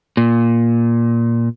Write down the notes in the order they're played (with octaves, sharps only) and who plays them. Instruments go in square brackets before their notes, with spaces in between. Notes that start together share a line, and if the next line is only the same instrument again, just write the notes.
[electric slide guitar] A#2